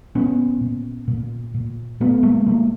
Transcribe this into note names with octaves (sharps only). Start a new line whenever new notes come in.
A#2 B3 C#4
A#2
A#2
A#2
A#2 A3 B3
G#3 A#3
A#2 G#3 A#3